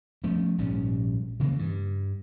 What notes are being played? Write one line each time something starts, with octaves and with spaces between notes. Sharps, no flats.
F3 A3 B3 C#4
A#1 G#2 G3 C#4
C#3 E3 G3 A#3
G2